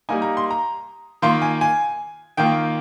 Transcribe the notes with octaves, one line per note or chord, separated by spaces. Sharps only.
G3 A#3 D#4 G#5
A#5
C6
A#5
D#3 A#3 F4 C6
G#5
G#5
D#3 A#3 F4 G5